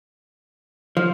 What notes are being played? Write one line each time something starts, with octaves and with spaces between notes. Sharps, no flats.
F3